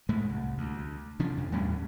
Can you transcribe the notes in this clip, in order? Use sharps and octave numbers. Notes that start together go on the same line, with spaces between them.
A2 G#3 A3
C2
D2
C3 F3 C#4 D4
F2
D#2 A2 G3 C#4